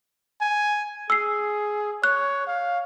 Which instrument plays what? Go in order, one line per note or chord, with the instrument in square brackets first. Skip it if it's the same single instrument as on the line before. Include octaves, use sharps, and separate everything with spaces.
[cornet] G#5
[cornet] G#4 [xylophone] E6 C7
[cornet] C#5 [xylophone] F#6
[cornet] F5